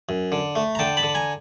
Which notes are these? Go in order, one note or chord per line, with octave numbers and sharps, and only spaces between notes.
F#2
D3
A3
A#5
D3 G5 A5
A5 B5
D3
G#5 A#5